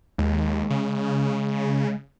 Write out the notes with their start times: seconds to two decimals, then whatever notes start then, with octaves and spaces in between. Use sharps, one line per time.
0.18 D#2 G#3
0.70 C#3